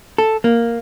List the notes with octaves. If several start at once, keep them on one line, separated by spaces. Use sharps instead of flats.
A4
A#3